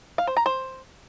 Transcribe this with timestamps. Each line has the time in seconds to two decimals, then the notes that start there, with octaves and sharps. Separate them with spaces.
0.18 F5
0.27 C5
0.37 A#5
0.46 C5